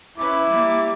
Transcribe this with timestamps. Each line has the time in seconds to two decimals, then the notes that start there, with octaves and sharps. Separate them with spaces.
0.18 C#4 E4 B4 D6
0.49 G3 A#3